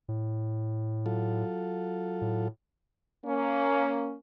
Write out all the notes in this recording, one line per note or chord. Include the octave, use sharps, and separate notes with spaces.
A2
F#3 F4 A4
A2
A#3 C#4